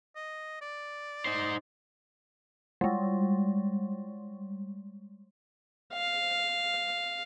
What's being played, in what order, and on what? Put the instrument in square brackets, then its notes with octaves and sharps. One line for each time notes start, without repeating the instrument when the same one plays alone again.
[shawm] D#5
D5
[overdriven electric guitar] D#4 C5
[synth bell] G3 G#3
[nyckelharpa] F5